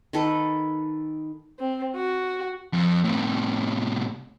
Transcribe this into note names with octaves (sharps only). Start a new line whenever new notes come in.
D#3 A4 B4
C4
F#4
F2
A2 C3